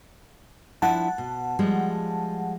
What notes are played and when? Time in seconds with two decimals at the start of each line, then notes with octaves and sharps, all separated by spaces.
0.82 F3 D4 E4 F#5 A5
1.18 B2
1.59 F3 G3 G#3